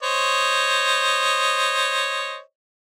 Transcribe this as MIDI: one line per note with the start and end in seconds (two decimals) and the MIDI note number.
0.03 2.40 72
0.03 2.40 73
0.03 2.40 75